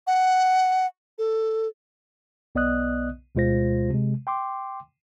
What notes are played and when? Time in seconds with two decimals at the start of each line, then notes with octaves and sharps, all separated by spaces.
0.07 F#5
1.18 A4
2.55 B1 B3 D5 D#5 D#6 F#6
3.35 D2 B2 G#3 F4 C5 A#6
3.90 C3 G#3
4.27 G5 C6 D6